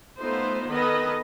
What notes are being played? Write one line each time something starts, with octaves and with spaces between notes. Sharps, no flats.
A3 B3 D#4 F4 C5
D#3 B3 A4 B4 D#5 B5